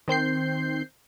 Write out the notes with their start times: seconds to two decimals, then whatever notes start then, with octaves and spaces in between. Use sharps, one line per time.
0.08 D#3 C4 G6 C7